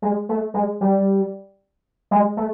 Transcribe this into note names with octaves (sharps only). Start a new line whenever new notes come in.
G#3
A3
G#3
G3
G#3
A3